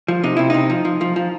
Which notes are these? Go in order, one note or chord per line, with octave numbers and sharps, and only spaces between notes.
F3
C3 D#4
C3 E4
C3 D#4
F3
F3
F3
F3